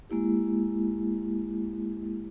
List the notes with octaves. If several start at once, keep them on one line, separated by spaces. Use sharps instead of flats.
G#3 A#3 E4 G4